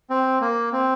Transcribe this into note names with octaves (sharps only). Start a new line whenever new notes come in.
C4
A#3
C4